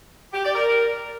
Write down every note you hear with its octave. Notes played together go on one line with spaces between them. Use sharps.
G4
D5
A#4